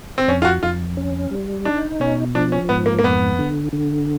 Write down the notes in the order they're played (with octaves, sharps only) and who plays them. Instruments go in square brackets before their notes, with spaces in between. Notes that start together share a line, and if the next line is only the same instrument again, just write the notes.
[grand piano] C4
[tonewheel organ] F2 [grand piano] C#4
[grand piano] F4
F#4
[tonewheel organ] F2 [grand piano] F4
[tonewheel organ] C#4
G3
[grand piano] D4 [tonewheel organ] D#4
[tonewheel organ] B2 [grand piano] C#4
[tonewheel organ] F3 [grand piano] D4
[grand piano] C#4
[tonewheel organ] G#2 [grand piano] B3
[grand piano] A#3
A#3
[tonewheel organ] F2 [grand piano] B3
[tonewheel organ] D3
D3